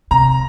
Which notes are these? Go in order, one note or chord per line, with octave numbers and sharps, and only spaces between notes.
C3 A#5